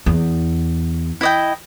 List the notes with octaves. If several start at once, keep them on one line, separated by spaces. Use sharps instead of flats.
E2
E4 D#5 G5